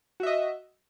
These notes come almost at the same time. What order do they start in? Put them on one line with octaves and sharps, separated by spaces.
F#4 E5 D#5